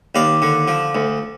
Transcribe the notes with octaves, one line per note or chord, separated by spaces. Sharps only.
D#2 D5 F5
D3
F3
D2